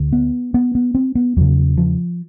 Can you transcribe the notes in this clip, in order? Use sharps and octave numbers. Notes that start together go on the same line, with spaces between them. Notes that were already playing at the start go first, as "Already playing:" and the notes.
Already playing: D2 D3
B3
B3
B3
C4
B3
E2 C#3 F#3
F3